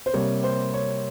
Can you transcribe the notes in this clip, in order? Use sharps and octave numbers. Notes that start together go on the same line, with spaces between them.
C5
C3 G3 A#3 C#5
C5
C#5